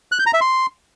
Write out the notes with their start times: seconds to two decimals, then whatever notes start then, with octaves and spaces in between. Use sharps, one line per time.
0.12 F#6
0.19 G6
0.26 A#5
0.34 E5
0.41 C6